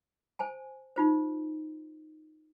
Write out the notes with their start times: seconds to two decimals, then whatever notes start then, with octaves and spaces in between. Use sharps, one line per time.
0.39 C5 G#5 A5
0.96 D#4 F4 C5